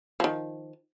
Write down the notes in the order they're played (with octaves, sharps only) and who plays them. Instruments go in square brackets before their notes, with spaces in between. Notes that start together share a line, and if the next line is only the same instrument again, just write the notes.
[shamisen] D#3 F3